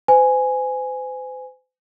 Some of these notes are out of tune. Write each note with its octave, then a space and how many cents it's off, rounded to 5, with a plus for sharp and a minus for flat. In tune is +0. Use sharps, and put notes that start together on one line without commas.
C5 -40 G#5 +0